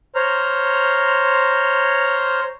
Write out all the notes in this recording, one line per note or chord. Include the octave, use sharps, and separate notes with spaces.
C5 C#5 A#5 F6